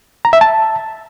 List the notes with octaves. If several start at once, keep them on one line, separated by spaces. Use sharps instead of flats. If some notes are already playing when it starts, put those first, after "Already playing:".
A#5
E5
A5